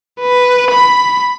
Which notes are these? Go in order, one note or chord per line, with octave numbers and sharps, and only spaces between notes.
B4
B5